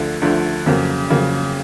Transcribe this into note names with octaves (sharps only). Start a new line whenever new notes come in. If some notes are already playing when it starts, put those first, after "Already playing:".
Already playing: D2 D3 F3 A3
D2 D3 F3 A3
F2 C#3 F#3 A#3
F2 C#3 F#3 A#3